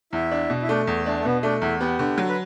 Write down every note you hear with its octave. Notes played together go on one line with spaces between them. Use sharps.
E2 E4
D4
B2
E4
A3 D4
E2
A3 D4
A3
B2 B3
A3 D4
E2 E4
B3 G4
D3
F#3
B4